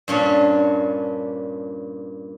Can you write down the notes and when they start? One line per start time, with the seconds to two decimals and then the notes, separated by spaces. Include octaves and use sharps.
0.08 G2 A#2 C#4 D4